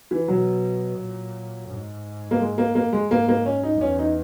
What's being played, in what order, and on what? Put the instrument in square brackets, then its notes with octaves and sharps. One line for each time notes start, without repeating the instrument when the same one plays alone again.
[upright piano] E3
[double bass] B2 [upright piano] F#3
[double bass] A#2
G#2
[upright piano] A#3
G#3
A#3
A#3
G#3
[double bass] G#2 [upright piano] A#3
[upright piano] A#3
C#4
D#4
[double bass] E2 [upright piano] C#4
[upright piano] D#4